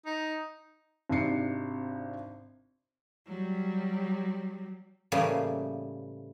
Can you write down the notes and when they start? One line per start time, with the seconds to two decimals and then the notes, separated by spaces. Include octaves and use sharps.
0.06 D#4
1.09 G#1 G#2 C3 D4 C7 C#7
3.27 F#3 G3
5.12 A2 C#3 E3 G3 A#3